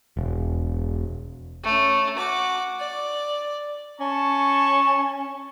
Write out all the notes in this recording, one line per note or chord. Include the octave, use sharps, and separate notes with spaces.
E1
A3 C#4
F#4 D6
D5
C#4 A5 C#6